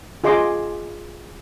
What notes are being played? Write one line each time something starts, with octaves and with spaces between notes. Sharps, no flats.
F4 G#4 D#5 C6 D6